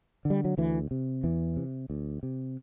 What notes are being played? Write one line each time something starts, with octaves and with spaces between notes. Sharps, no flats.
D3
G3
F#3
D2 E3
C3
E2 E3
C3
D2
C3